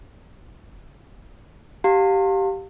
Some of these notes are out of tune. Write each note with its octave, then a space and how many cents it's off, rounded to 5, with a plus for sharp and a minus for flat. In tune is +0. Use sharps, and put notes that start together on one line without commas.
G4 -10 F5 +25 A5 +45